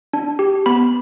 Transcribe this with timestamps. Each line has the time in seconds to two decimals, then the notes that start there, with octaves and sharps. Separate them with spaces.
0.13 D4
0.39 G4
0.66 B3 B5